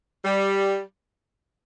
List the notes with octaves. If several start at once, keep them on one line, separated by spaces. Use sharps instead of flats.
G3